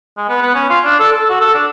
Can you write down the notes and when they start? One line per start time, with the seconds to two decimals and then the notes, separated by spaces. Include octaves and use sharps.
0.17 G#3
0.29 B3
0.42 B3
0.54 C#4
0.70 F4
0.84 D4
0.99 A4
1.12 A4
1.29 F#4
1.41 A4
1.54 D4